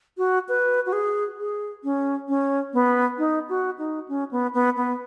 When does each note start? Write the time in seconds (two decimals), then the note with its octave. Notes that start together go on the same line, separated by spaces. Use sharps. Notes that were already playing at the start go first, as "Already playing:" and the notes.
0.18 F#4
0.49 B4
0.86 F#4
0.93 G#4
1.39 G#4
1.84 C#4
2.28 C#4
2.73 B3
3.18 D#4
3.49 F#4
3.79 D#4
4.08 C#4
4.31 B3
4.54 B3
4.76 B3